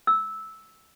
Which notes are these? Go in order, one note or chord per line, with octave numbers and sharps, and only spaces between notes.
E6